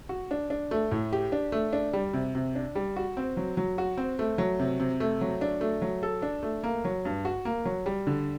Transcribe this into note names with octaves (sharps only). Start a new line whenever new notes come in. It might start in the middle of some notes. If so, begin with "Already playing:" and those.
F#4
D4
D4
A3
A2
G4
D4
A3
D4
G3
C3
C3
D4
G3
F#4
C4
F#3
F#3
F#4
C4
A3
F#3
C3
C3
A3
F#3
D4
A3
F#3
A4
D4
A3
A#3
F#3
G2
F#4
A#3
F#3
G3
D3